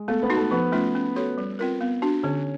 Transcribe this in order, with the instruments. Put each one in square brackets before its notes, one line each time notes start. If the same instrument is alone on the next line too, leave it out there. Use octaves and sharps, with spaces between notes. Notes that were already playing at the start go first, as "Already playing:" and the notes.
Already playing: [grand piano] G#3
[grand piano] A3 A4 [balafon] B3
[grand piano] B3 B4
[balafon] D#4 F#4
[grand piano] A3 A4
[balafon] F3 [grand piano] B3 B4
[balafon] A3 C#4 F4
C#4
F#4 A4 C#5
G3
C4 F4 A#4
B3
D4 F#4
[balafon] D3 [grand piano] C#4 C#5